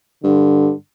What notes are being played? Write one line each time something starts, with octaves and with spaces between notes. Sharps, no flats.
G2 D3